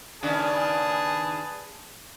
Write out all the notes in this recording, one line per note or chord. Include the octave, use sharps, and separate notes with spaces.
D#2 C#3 D4 G#4 B4 A5